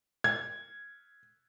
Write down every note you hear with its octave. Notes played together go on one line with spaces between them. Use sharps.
G#6